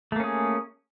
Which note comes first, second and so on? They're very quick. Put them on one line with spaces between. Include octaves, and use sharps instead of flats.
A3 A#3 C#4 G#4